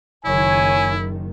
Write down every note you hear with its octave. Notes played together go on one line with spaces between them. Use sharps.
F#1 D#3 E4 C#5 G#5